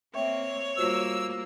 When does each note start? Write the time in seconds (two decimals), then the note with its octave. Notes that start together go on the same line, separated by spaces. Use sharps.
0.14 A#3 C4 C#5 E5 G5 C#6
0.77 G3 A#3 F4 F#4 C5 E6